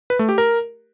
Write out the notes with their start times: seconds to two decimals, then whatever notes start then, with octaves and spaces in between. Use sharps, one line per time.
0.10 B4
0.19 A3
0.29 G4
0.38 A#4